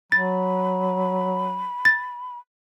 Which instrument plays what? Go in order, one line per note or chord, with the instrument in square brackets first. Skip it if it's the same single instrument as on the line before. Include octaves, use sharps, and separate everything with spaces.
[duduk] F#3 [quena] B5 [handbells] A6
[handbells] A6